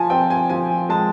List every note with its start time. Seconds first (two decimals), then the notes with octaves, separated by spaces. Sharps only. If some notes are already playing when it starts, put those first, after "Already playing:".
Already playing: F3 G#5 A5
0.10 C4 G5
0.30 G#5
0.49 F3 G#5
0.89 G#3 A5